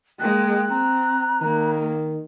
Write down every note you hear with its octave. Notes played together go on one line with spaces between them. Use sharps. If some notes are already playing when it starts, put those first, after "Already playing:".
G#3 A#3 G5 F#6
C4 A#5
D#3 A#3